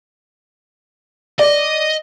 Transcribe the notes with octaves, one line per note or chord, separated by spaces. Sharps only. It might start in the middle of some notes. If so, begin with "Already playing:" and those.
D5 D#5